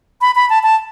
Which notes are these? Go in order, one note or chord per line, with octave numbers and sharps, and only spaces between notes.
B5
B5
A5
A5